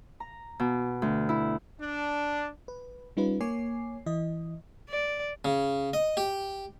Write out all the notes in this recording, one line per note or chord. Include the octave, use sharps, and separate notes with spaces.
A#5
B2
D2
E4
D4
B4
G3 C#4 D#4 F4 B4
A#3 C#5 G#5 D6 C7
E3 E4 D#5
D5
C#3
D#5
G4